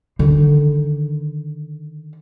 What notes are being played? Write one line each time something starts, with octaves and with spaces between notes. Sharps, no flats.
D3 D#3